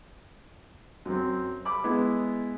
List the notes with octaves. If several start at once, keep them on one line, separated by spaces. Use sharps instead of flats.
F#2 C4
B5 D6
G#3 B3 E4